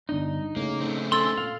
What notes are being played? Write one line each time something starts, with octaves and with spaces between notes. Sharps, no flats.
G1 D4 D#4
A2 C#3 A#3
A3 C4
C#4 A4 C6 E6 A6
A#2 F5